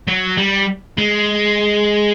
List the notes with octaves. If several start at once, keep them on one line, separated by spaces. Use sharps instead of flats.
F#3
G3
G#3